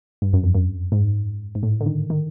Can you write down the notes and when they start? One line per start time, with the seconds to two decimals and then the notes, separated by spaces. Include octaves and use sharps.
0.22 G2
0.33 F#2
0.43 F2
0.55 F#2
0.92 G#2
1.55 G#2
1.63 A2
1.80 D3
1.86 D#3
2.10 D#3